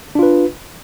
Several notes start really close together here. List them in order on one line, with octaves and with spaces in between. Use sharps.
D4 F4 B4